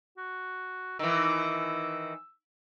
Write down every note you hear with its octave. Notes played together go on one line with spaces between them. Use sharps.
F#4
D#3 E3 E6